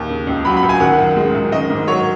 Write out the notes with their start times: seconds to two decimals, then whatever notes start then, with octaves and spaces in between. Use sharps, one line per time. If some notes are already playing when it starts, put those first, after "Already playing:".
Already playing: D#2
0.09 C#3
0.27 C#2
0.45 F#3 B5
0.57 B5
0.63 C#2
0.69 G#5
0.80 D#3 F#5
0.98 F#2
1.16 G#3
1.35 F#2
1.52 D#3 D#5
1.70 G#2
1.88 F#3 C#5